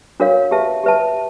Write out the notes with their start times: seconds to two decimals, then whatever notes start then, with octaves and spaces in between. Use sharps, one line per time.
0.20 D4 F#4 A#4 C#5 F5
0.51 G4 B4 E5 A5
0.84 G4 B4 E5 A5